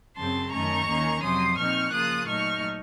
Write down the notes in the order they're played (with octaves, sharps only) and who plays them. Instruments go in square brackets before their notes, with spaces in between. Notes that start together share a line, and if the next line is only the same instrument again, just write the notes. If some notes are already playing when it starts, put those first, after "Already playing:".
[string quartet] F#2 C#3 F#3 C4 A5 C6
F#2 D#3 A3 C#4 A#5 C#6
D#2 D#3 A#3 C#4
F2 C3 F#3 C6 D#6
A#2 F3 C4 D#4 C#6 F6
C#3 F3 A#3 F4 D#6 F#6
A#2 F#3 A3 D#4 C#6 F6